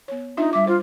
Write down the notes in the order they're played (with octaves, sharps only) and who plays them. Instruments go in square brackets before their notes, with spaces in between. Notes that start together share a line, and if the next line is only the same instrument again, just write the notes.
[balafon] B3 C#5
[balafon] D4 F4 E5 [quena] D#4
[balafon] G3 D6 [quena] E5
[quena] F4 [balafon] C5